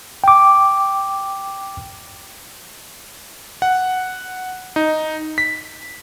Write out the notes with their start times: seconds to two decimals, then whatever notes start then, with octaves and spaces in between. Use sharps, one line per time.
0.24 G5 D6
3.62 F#5
4.76 D#4
5.38 B6